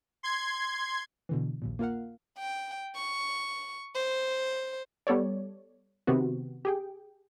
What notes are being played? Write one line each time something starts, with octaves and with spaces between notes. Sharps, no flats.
C6 G#6
B2 D3 E3
A#1 D#2 A#2
A#3 F4 A#4 F5 F#5
G5
C#6
C5
G3 B3 A4 C#5 D5
C3 D#3 B3 C4 F#4
G4 G#4 G5